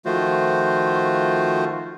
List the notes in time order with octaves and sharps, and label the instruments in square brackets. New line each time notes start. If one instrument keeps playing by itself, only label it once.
[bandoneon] D#3 F3 A3 F4 F#4 C5